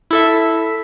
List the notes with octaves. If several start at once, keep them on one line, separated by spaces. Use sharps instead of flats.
E4 A4 E5